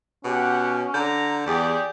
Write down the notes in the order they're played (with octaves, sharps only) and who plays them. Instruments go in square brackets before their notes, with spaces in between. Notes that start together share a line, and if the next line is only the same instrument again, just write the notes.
[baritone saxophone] B2 [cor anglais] C#4 [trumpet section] G4 F#5
[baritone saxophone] D3 [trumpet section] A#5 [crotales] G6
[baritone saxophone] E2 [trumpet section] G4 D5 [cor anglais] G#4